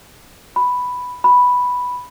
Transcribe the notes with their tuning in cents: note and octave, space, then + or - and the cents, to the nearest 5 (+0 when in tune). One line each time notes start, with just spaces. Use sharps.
B5 +5
B5 +0